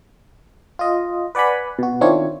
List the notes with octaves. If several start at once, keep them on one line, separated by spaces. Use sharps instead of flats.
F4 D#5
B4 D5 F#5 G#5 B5
B2 F#4
D#3 C4 D4 E4 F4 C#5